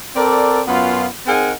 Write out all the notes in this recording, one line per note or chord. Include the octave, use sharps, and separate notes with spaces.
C4 A4 A#4 D5
F#2 B3 F4
C4 D#4 G#4 A#4 F#5 G#5